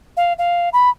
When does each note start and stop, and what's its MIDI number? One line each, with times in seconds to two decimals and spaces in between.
0.17 0.33 77
0.38 0.69 77
0.73 0.89 83